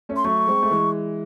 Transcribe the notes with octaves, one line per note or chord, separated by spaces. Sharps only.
A3 C#4
C6
F#3 A3 C#6
G#3 C4
A3
E3 G#3